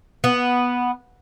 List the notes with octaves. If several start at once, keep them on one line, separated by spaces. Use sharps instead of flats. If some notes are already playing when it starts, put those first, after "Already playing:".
B3